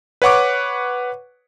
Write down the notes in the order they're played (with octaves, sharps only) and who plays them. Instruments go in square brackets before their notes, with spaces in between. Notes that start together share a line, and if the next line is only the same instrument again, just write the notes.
[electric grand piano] B4 C#5 F#5 C#6 D6